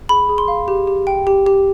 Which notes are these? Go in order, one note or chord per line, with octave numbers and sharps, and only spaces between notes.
G#4 B5
G#4
C6
F5
G4
G4
G5
G4
G4